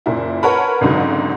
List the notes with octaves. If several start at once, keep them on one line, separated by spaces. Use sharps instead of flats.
F#1 A#2 E4
A#4 B4 C#5 F#5 A5 B5
G#1 C#2 G#2 D3 F#3